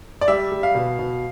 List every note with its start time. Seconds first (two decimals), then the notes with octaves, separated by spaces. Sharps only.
0.21 D5
0.28 G3 E5
0.52 G3
0.63 F5
0.75 B2
0.99 B2